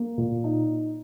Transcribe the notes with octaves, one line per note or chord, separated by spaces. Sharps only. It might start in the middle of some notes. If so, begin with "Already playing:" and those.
Already playing: A#3
A#2
D#4